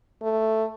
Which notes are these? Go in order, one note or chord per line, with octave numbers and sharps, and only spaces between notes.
A3